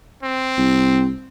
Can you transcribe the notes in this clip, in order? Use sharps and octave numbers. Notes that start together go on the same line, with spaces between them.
C4
C2